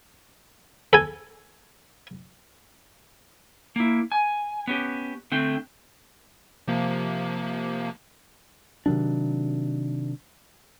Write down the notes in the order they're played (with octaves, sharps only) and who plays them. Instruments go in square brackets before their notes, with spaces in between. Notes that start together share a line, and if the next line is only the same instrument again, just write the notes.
[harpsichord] A4 G#5
[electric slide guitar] A#3 E4
G#5
B3 C#4 G4
D3 A3 C4 G5
[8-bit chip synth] C3 F3 A#3
[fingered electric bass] C3 D#3 F#3 D4